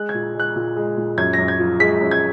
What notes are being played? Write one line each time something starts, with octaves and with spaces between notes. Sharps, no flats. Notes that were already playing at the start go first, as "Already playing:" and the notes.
Already playing: G#3 F#6
G#6
A#2
G#3 F#6
A#2
G#3
A#2
F#2 G#6
F#2 A#6
G#6
F3
G#3 B6
F#2
G#6